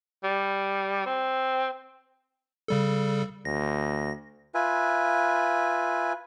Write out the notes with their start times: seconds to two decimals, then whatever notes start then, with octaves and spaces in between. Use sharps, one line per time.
0.24 G3
1.06 C4
2.68 C#3 G3 A4
3.45 D2 A#6
4.54 F4 B4 E5 G#5